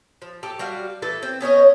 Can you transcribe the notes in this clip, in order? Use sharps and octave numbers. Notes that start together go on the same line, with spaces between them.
F3
G4 A4
G3 F#4 F5
E3 A3 E4 A4
C4
B3 C#4 C#5 D#5